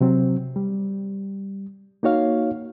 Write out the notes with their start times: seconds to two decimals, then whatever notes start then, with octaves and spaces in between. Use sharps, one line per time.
0.01 C3 F#3 C4
0.56 G3
2.03 A#3 D#4 F#4 C#5 F5